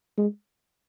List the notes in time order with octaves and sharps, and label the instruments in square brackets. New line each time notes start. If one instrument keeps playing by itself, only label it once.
[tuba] G#3